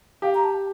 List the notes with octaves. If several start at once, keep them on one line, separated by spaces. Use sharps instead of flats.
G4 F5
A#5
A5